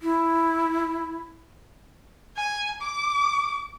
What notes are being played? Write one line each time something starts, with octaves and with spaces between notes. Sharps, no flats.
E4
G#5
D6